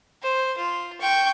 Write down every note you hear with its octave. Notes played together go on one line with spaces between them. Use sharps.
C5
F4
G5 C#6